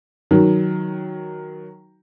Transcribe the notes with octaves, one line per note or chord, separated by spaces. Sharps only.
D#3 F#3